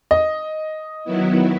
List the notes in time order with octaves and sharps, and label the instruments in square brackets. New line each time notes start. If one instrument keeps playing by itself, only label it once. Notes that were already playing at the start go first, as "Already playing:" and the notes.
[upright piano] D#5
[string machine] D#3 F#3 B3 E4